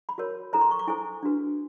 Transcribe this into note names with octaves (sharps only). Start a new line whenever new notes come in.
B5
F#4 A#4 C#5
E4 A4 C5 A#5
C6
C#6
D6
E4 A4 C5 G#5
D4 F#4 B4